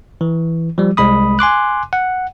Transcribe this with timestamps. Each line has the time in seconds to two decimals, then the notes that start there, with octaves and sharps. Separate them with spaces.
0.21 E3
0.78 F3 G3
0.97 C2 G#3 B5 D#6
1.39 G#5 C6 D6 F#6
1.93 F#5